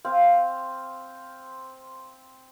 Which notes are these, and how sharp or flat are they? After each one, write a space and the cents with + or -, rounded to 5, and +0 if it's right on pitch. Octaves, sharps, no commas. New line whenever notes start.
C4 +0 F5 +0